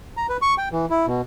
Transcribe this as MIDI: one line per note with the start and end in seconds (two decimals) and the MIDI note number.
0.17 0.26 82
0.29 0.37 71
0.42 0.55 85
0.58 0.69 79
0.72 0.86 52
0.90 1.06 64
1.06 1.21 47